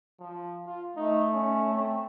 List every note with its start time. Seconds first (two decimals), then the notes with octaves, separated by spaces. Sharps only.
0.20 F3
0.67 F4
0.97 A3 D#4
1.34 C#4
1.73 C4